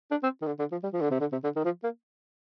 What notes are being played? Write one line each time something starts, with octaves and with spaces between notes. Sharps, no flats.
D4
C4
D#3
D3
D3
F3
G3
F3
D3
C3
D3
C3
D3
D#3
F3
A#3